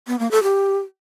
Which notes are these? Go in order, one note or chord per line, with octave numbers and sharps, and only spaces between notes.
B3
A#3
A4
G4